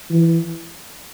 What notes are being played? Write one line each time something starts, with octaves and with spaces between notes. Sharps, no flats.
E3